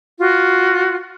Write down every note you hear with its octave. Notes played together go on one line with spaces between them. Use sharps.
F4 F#4